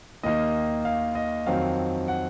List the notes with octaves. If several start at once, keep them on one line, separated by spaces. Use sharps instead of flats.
D#2 D#3 A#3 D#4 D#5
F5
D#5
F2 D#3 F#3 C4 F5
F#5